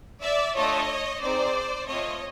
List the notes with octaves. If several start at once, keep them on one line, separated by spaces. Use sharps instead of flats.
D5 E5
A3 D4 F4 A4 C#5 D#5
C4 D#4 G#4 C5 D5
A3 C4 F4 C#5 D#5